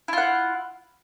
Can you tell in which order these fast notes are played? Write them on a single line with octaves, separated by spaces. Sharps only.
E4 F4 F#5